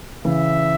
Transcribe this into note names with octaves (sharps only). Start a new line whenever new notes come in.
C#3 E3 E5